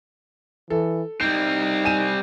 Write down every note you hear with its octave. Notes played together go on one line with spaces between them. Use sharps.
E3 A4
G3 C4 D#4 G6
G#5 D#7 E7